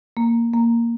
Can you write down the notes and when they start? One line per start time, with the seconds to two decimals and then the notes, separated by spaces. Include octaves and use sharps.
0.17 A#3
0.53 A#3